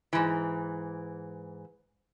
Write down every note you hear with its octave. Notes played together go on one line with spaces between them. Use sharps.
G#2 E3